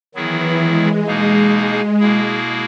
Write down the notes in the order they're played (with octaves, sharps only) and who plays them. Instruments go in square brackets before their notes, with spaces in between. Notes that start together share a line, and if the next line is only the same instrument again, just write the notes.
[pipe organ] D#3 F#3 B3 E4 G#4 [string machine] E3
[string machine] G#3
[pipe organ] B2 A#3 D#4 G#4
[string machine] G#3
[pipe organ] B2 A#3 E4 G#4